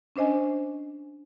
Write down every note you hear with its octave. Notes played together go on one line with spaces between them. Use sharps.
C#4 D4 C5 D#5 G#5